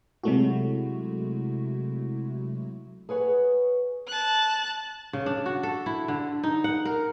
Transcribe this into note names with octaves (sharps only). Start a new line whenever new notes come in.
C3 F#3 G#3 A3 E4 F#4
G#4 B4 C#5 F#5
A5 F#6
C#3
D4
F#4
A4
E4
D3
D#4
F#5
A#4